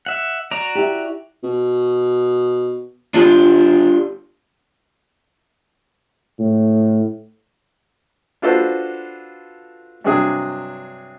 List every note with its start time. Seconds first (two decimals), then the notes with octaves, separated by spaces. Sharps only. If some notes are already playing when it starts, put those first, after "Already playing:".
0.06 E5 F#5
0.51 F#4 D5 A#5
0.75 E4 G4
1.44 B2
3.14 G1 D4 F4 G4
6.39 A2
8.42 D4 F4 F#4 A4 B4 C5
10.04 G2 C3 F#3 D4 G#4